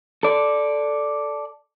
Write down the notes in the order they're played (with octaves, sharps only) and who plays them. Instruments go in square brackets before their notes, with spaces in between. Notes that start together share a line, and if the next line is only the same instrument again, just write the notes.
[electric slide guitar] A4 D5